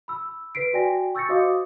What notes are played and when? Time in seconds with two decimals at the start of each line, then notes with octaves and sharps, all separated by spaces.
0.08 B5 E6
0.55 B4 B6 C7 D7
0.73 F#4 D5 G5 G#5 A#6
1.15 C#6 E6 G6 A6 A#6 C#7
1.29 F#4 C5 D#5 F5 D6 D#6